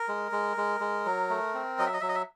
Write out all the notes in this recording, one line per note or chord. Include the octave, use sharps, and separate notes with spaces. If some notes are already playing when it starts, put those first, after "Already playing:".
Already playing: A#4
G#3
G#3
G#3
G#3
F#3
A3
C4
F#3 D#5
E5
D#5
F#3 E5
D#5
E5